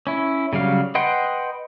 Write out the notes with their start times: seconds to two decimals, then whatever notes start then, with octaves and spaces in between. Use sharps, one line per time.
0.07 C#4 E4
0.53 C#3 F#3 G3 F5
0.95 B4 D#5 F#5 G5 C6